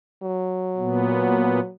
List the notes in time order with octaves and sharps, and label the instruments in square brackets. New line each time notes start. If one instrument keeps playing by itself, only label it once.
[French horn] F#3
[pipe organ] A#2 B3